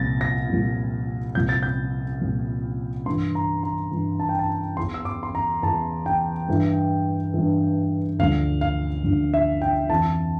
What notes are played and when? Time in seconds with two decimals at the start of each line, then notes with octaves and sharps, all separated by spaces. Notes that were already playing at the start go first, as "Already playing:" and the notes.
Already playing: C2 A#2 F3 A6 A#6
0.21 A#6
0.49 C2 A#2 F3
1.35 C2 A#2 F3 G6
1.49 A6
1.63 G6
2.21 C2 A#2 F3
3.06 G2 E3 C6
3.35 A#5
3.63 A#5
3.91 G2 E3
4.20 A5
4.29 G5
4.39 A5
4.77 E2 E3 C6
4.94 E6
5.05 D6
5.23 C6
5.35 A#5
5.63 E2 E3 A5
6.06 G5
6.49 G2 E3
7.34 G2 E3
8.19 D2 D3 F3 F5
8.61 F5
9.04 D2 D3 F3
9.34 E5
9.62 G5
9.90 F2 E3 A5